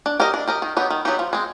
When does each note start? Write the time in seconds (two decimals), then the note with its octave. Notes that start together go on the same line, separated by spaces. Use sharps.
0.06 D4
0.20 G4 A#4 D#5
0.34 D4
0.47 G4 A#4 D#5
0.62 D#3
0.77 F#3 B3 D#4 G4
0.90 D#3
1.05 F#3 B3 D#4 G4
1.19 F3
1.33 G#3 C4